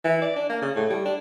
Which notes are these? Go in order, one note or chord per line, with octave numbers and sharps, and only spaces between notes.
E3
D5
D4
A#3
C#3
A2
G3
D4